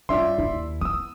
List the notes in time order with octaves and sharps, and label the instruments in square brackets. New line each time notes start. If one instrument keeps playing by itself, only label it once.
[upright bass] G2 [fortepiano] C#4 F4 [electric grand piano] D5 E5 C6
[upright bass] D#2 [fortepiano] E4
[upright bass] B3 [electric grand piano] D#6 E6